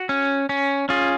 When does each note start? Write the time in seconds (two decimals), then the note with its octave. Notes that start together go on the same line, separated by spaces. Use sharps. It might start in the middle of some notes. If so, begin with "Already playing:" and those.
Already playing: F#4
0.09 C#4
0.49 C#4
0.89 C#4 F4 G#4